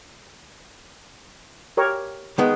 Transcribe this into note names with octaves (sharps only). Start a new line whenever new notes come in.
G4 A#4 C#5
D#3 G#3 B3